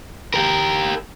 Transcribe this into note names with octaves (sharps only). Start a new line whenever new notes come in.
G4 A#4